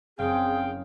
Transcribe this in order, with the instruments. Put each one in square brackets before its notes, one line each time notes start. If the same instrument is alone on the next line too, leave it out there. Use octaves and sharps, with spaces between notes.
[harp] F#1 [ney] C4 [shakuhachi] G#4 [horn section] F5 G5